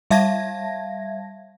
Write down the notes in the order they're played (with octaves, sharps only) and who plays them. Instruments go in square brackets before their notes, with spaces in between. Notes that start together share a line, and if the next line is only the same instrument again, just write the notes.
[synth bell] G3 E5 F5 A5 G#6 A#6